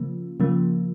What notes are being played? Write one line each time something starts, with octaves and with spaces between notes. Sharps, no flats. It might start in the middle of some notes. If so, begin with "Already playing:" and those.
Already playing: C#3 F3 A#3
C#3 F3 A#3